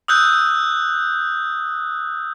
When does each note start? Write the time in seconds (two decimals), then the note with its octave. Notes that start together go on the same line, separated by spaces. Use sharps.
0.08 D#6 E6 F#6 G6